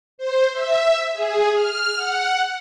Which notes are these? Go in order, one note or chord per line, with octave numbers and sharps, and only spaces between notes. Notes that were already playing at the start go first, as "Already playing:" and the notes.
C5
E5
G#4
F6
F#5